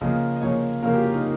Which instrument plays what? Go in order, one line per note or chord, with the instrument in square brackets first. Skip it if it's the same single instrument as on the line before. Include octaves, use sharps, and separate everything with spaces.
[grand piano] C#3 F3 A#3 [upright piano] D#5
[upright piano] D#5
[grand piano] C#3 F3 A#3 [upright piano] C#5
[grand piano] C#3 F3 A#3 [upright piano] A#4
[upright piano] G4
F4
D#4